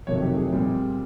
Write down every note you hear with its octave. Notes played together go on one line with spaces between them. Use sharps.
F2 C3 D#3 F#3 A3 C#5
G4
G#4
A#2 G3 C4